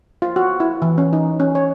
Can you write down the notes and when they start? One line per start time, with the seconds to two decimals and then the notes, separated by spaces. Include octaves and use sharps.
0.22 F4
0.36 F#4
0.60 E4
0.82 E3
0.98 C#4
1.13 D#4
1.40 C#4
1.55 C#5